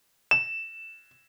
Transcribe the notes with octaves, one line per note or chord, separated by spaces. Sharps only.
E7